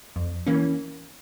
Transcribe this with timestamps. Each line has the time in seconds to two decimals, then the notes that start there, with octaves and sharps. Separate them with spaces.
0.16 F2
0.47 E3 A#3 C#4